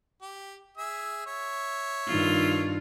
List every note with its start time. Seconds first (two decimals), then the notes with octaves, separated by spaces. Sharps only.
0.21 G4
0.77 G#4 E5 E6
1.26 C#5 E5
2.07 G2 D#3 F4